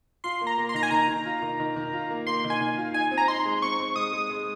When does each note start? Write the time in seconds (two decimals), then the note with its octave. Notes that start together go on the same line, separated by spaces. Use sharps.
0.24 F4 C6
0.41 A#3
0.47 A#5
0.58 A#3
0.69 C6
0.74 D#3 A#5
0.83 G#5
0.91 D#3 A#5
1.08 D#3
1.26 F4
1.42 D#3
1.60 D#3
1.76 D#3
1.93 F4
2.10 A#3
2.27 A#3 C6
2.44 D#3
2.50 G#5
2.61 D#3
2.78 F4
2.94 D#4 G#5
3.11 C4
3.18 A#5
3.28 D#4 C6
3.45 G#3
3.62 C4 C#6
3.80 C4
3.96 G#3 D#6
4.13 G#3
4.30 G#3